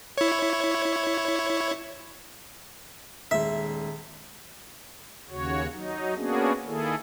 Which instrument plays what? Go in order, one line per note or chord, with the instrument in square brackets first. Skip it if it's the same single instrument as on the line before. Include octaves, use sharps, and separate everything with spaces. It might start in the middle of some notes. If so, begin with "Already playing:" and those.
[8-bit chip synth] E4 C#5
[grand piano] D#1 G#3 [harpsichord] E5
[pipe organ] D#2 C#3 F#4 C#5
F#3 D#4
A#3 B3 C#4 D4 F#4 G#4
D#3 A#3 E4 G#4 A4